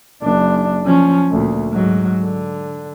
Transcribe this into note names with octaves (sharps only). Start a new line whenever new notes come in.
F#1 D4
F3 C#4
D2 A#2
G#2 F#3
D3